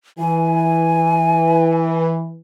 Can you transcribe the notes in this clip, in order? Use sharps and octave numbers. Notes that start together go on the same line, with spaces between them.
E3 G#5